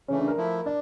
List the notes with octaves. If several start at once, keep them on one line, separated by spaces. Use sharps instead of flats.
C#3 E3 A3 C#4
D4
A#4
F3 A3 E4
D4 D5